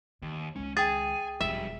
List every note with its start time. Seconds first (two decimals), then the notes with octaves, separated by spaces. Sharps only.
0.22 D#2 D#3
0.56 C#2 D#3 C#4
0.77 G#4 G5 G#5 A6
1.41 E1 F2 G3 F4 E5